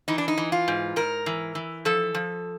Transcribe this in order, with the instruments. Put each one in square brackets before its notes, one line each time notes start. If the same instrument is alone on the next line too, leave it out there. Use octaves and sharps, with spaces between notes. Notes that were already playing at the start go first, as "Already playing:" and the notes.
[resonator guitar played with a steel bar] E3 D#4
D4
D#4
E3
F4
G#2
G#2 A#4
E3
E3
F3 A4
F3